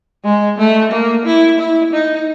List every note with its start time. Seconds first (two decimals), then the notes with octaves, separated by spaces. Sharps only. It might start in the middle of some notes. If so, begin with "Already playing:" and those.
0.24 G#3
0.58 A3
0.91 A#3
1.25 E4
1.59 E4
1.93 D#4